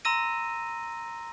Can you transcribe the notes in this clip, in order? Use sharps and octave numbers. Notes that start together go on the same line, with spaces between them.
A#5 C6 E6 A#6 D#7